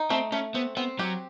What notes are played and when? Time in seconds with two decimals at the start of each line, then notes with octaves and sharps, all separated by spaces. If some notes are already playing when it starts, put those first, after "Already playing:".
Already playing: D#4
0.10 A3 C4
0.32 A3 C#4
0.54 B3 C4
0.77 B3 C4
0.99 F#3 G4